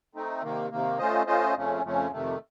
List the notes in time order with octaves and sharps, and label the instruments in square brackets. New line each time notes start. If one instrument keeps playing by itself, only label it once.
[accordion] A3 C4 D#4
C3 D#3 A#3
C3 D#3 A#3
A3 C#4 F4 C5 D#5
A3 C#4 F4 C5 D#5
F2 C#3 F3 A3 C#4
F2 C#3 F3 A3 C#4
F2 C3 D#3 A3